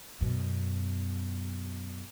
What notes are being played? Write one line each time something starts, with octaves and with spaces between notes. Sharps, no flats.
F#2 B2